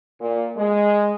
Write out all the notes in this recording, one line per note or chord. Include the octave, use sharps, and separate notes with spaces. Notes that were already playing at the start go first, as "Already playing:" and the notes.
A#2
G#3